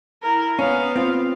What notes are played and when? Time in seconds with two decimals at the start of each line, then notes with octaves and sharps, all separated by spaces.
0.23 E4 A#4
0.59 B3 C#4 F5
0.96 C4 F4